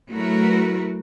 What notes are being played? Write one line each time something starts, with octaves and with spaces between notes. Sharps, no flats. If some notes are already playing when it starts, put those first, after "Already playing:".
F#3 A3 E4 F#4 A#4 B4